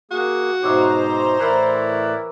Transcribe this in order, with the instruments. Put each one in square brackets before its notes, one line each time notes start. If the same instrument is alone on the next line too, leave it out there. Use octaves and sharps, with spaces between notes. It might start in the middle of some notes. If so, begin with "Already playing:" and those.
[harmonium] A#3 G#4 [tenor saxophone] F#4
[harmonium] G#2 B2 D#4 [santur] G4 C#5 E5 [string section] C5 A#5
[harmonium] A2 D5 [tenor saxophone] E3 [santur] A#4 B4 E5